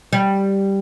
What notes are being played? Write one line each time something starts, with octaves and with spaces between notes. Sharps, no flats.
G3